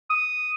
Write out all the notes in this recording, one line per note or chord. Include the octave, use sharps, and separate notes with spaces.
D#6